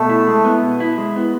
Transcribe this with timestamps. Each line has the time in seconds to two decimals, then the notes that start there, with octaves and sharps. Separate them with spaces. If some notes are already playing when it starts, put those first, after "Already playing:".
Already playing: B2 A3
0.09 E4
0.27 G#3
0.45 B3
0.62 B2
0.80 E4
0.98 G#3
1.16 B3